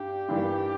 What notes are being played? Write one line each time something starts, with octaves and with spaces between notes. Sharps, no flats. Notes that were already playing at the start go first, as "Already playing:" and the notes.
Already playing: G2 D4 G4
G2 E3 G3 A#3 D4